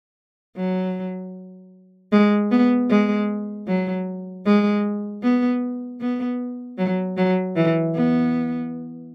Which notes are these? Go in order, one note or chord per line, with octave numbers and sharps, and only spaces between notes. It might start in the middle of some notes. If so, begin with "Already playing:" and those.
F#3
G#3
B3
G#3
F#3
G#3
B3
B3
F#3
F#3
E3
B3